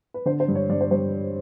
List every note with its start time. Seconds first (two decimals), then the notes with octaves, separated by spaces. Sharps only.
0.14 B4
0.26 D3 C5
0.40 C5
0.48 G2
0.55 C#5
0.69 G2 D5
0.81 C5
0.91 G3 C5